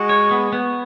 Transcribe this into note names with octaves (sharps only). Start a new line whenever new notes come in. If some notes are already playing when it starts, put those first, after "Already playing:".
Already playing: G#3 F#4
C#5
B3
B3